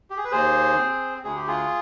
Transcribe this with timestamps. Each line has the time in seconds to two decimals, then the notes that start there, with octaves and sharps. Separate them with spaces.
0.10 G4
0.17 G#4
0.24 B4
0.32 D#2 G#4 C5
0.78 C4
1.24 D2 G#4
1.36 G4
1.47 F4 G#4